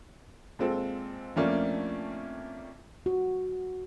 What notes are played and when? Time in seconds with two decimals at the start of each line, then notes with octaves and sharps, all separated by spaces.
0.59 A#2 G#3 C4 A4
1.36 F2 F3 A3 A#3 C#4 D4
3.06 F#4